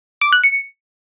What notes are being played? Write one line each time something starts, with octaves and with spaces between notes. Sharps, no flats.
D6
F#6
C#7